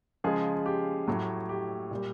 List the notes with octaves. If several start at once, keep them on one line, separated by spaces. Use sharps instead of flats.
C#3 F3 G#3 G#4
G4
A2 F#3 A3
G4
A#2 G3